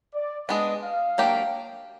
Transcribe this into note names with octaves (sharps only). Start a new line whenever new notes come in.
D5
G#3 B3 D4 D#5
F5
F#3 A#3 D4 G4